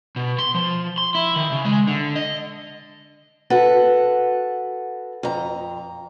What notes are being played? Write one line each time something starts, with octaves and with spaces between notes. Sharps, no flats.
B2
C6
F3
C6
E4
D#3
C#3
G#3
D3
D#5
F#4 A4 B4
F2 A#5